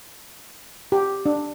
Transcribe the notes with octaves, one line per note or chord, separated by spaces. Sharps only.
G4
D4